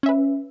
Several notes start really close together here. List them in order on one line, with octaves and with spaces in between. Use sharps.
C#4 E5 B4